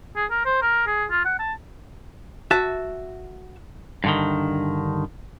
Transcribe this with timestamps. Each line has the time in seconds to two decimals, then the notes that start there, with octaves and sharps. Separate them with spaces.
0.16 G#4
0.31 A#4
0.45 C5
0.62 A#4
0.87 G#4
1.11 F4
1.25 F#5
1.39 A5
2.51 F#4 E5 A5
4.04 G2 D3 D#3